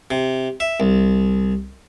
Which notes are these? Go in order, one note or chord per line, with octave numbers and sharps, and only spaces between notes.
C3
E5
C2